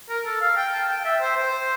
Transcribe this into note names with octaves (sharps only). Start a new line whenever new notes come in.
A#4
A4
F5
G5
A5
G5
E5
C5
C5